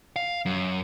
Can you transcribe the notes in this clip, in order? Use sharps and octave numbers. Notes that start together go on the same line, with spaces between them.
F5
F#2